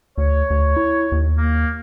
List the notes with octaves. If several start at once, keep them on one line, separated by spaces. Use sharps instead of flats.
D2 C#5
D2
E4
D#2
A#3